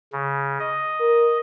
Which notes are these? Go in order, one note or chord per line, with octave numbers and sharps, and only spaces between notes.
C#3
D#5
A#4